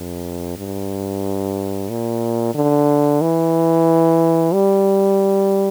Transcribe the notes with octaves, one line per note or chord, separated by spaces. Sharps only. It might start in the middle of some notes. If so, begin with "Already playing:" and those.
Already playing: F2
G2
A#2
D3
E3
G3